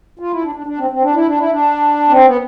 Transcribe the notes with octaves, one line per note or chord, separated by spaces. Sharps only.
F4
E4
D4
D4
D4
C4
C4
D4
E4
D4
E4
D4
C4
B3